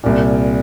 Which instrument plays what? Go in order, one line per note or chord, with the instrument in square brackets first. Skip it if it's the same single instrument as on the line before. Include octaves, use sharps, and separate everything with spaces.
[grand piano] C2 A#2